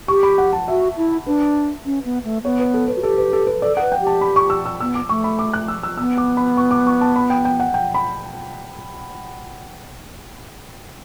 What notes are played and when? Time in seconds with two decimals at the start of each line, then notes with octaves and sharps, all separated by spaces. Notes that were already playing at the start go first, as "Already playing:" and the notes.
0.08 G4 C#6
0.23 B5
0.38 F#5
0.53 A5
0.68 F#4 E5
0.97 E4
1.26 D4 B4
1.85 C#4
2.05 B3
2.24 A3
2.44 B3 C#5
2.59 B4
2.74 A4
2.88 B4
2.96 F#4
3.03 G4 A4
3.18 B4
3.33 A4
3.47 B4
3.61 A4 D5
3.77 A4 F#5
3.81 B4
3.92 G5
4.01 G4
4.07 A5
4.21 B5
4.36 C#6
4.50 E6
4.65 E6
4.80 B3 E6
4.95 D6
5.09 A3 C#6
5.24 B5
5.39 D6
5.54 F#6
5.68 E6
5.83 E6
5.98 B3 E6
6.18 D6
6.37 B5
6.57 C#6
6.71 D6
6.87 C#6
7.01 A5
7.16 B5
7.30 G5
7.45 G5
7.60 F#5
7.74 G5
7.94 B5